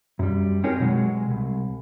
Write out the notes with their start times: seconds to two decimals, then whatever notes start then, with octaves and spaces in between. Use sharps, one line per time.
0.19 F#2 G3
0.64 C4 D#4 G4 G#4 A#4 C#5
0.80 B2 F#3 G#3
1.30 C2